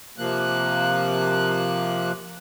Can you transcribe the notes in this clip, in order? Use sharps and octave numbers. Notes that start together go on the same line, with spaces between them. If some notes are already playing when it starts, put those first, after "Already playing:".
C3 F3 A#3 F#6